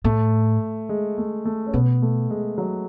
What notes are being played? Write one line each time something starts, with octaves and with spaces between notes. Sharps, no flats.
A2 A3
G#3
A3
A3
C#4
B2 B3
A3
G#3
F#3